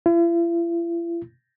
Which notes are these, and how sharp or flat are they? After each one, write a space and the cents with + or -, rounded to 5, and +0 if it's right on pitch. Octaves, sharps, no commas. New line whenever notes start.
E4 +45